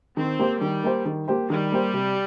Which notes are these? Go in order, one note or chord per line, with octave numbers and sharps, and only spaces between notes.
D#3 C4
A#3 G4 C5
D#3 G3
A#3 G4 C5
D#3
A#3 G4 C5
D#3 G3
A#3 G4 C5
C3